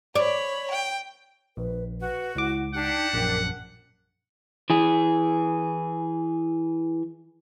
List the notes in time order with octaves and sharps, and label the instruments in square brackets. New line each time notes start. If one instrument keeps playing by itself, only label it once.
[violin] C#5 B5 [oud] D5
[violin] G5
[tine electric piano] A#1 [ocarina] B4
[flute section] F#4 [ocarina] B4
[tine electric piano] C#2 D6 [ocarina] E4
[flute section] D4 G4 [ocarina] D#4 [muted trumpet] F#5
[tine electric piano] A#1 F#2 [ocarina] A#4
[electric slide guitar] E3 G#4